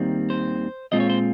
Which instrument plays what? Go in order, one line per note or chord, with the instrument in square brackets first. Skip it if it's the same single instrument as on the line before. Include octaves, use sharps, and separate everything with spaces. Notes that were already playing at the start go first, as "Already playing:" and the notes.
Already playing: [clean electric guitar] D#2 D#3 G3 C4
C5
A#2 G#3 C4 F4 D#5
C#5
C5